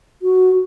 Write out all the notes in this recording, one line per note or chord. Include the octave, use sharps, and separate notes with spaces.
F#4